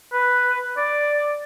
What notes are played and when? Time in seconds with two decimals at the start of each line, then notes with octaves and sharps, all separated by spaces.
0.12 B4
0.77 D5